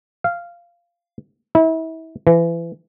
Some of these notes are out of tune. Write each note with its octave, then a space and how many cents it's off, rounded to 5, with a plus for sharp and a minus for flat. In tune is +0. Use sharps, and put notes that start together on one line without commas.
F5 -10
E4 -35
E3 +30